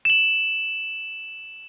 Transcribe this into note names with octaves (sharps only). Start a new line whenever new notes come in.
E7 F#7